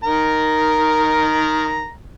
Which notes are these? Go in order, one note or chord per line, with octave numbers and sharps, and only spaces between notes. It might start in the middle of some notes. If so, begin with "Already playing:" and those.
D#3 A#4 A#5